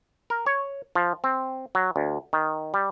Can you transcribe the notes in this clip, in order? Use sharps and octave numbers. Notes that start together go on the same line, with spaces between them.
A#4
C#5
F3
C4
F#3
D2
D#3
G3